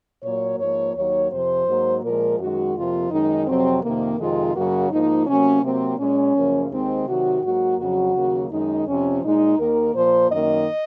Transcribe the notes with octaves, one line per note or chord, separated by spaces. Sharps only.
A#2 F#3 A#3 C#5
G#2 F3 A#3 C#5
D#2 D#3 F#3 A#3 C#5
F2 C3 F3 C5
G#2 F#3 A#3
A#2 F3 G#3 A#4
F#2 D#3 G#3 F#4
F2 C3 F3 A#3 F4
F#2 D#3 G#3 D#4
F2 C3 F#3 C4
F2 C3 D#3 A#3
F2 C3 D#3 G#3 F4
F#2 C#3 F#3 A#3 F#4
G#2 F3 A#3 D#4
C3 F#3 A#3 C#4
C3 F#3 A#3 C4
A#2 G#3 C#4
F#2 C#3 F3 A#3
D#2 D#3 G#3 C4
C3 D#3 F#3 F#4
G#2 F#3 A#3 F#4
F2 C#3 F#3 F#4
D#2 C#3 F#3 A#3
F#2 D#3 G#3 D#4
F2 C3 F3 C#4
A#2 G#3 D#4
D#2 D#3 A#3 A#4
A#2 F3 A#3 C5
F#2 D#3 A#3 D#5